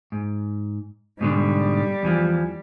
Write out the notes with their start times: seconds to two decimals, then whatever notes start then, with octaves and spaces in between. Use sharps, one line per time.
0.12 G#2
1.21 G#2 B2 D3 G3
2.03 E2 E3 F3